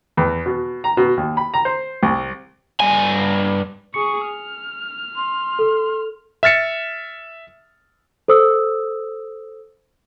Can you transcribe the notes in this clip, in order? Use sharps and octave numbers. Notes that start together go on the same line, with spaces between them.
E2
B2
A#5
B2
D#2
B5
A#5
C5
C2
G2 G#5
G#4 C#6 C#7
F6
C6
A4
E5 F6 A6 C#7
A4 C5 D#6 E6